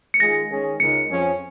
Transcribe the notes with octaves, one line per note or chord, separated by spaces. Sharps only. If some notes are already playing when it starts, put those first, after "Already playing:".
C#7
D#3 G#3 F4 G#4 A#6
D#3 G#3 C#4 G#4
C#2 C#3 G#3 D#4 A#4 C#7
F2 F3 C#4 G#4